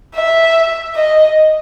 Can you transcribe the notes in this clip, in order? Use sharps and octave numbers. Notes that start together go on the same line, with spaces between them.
E5
D#5